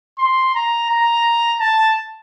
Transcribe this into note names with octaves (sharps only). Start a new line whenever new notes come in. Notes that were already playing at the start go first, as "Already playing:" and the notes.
C6
A#5
A#5
A5